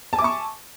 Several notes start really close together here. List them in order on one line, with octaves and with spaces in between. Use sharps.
A5 G#5 D6 E5 C#6